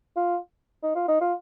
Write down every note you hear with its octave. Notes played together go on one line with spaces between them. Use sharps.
F4
D#4
F4
D#4
F4